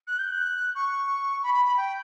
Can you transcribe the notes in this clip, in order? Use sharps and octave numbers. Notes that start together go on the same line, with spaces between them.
F#6
G6
F#6
C#6
B5
B5
B5
G5